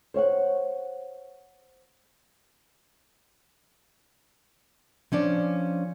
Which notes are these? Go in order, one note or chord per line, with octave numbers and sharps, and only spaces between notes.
C5 C#5 F5 F#5
F3 C#4 D4 D5